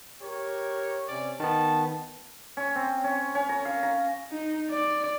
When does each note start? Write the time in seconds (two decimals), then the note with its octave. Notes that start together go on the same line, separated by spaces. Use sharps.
0.22 G4 A#4 C#5
1.08 C3 C#4 D5
1.40 D#3 B3 A5
2.57 C#4
2.76 C4
3.04 C#4
3.35 C#4
3.49 A#5
3.65 F5
3.83 A#5
4.31 D#4
4.70 D5